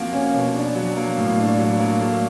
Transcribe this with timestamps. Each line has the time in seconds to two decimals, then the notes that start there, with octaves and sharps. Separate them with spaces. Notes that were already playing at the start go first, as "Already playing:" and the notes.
Already playing: F3 A#3 C4 F#4
0.13 C#4
0.33 B2
0.54 D4
0.75 F#3
0.96 A#3
1.17 A2
1.38 D4
1.59 F#3
1.79 A#3
2.01 A3